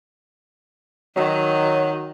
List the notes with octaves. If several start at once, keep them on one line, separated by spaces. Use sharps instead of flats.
D#3 F#3